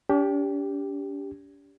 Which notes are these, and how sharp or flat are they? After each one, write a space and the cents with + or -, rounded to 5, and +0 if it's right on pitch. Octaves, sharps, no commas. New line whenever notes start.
D4 -45 G4 +5